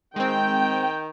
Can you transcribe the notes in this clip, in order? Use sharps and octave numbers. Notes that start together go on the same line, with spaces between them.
D#3 G#3 C4 G5